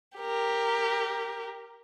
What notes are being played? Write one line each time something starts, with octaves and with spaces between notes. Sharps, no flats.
G4 A#4